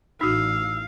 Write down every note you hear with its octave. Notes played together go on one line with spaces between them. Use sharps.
A1 D#4 F#4 F5 E6